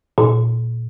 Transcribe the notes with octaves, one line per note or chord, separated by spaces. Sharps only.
A#2